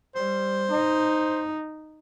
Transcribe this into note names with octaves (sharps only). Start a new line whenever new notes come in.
G3 C5
D#4